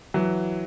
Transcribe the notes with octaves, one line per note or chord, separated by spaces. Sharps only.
E3 F#3